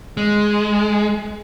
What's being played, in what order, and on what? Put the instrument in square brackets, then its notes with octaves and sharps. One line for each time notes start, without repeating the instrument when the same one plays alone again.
[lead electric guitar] G#3